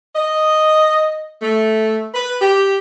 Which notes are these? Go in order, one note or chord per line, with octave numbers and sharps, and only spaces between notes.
D#5
A3
B4
G4